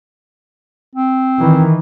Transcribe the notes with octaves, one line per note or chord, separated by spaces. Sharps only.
C4
D#3 E3